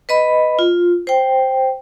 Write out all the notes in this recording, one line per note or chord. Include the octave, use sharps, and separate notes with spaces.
B4 D#5 B5
F4
C5 G5